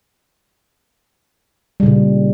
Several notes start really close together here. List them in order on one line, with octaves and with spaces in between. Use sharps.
G3 C#3 A#2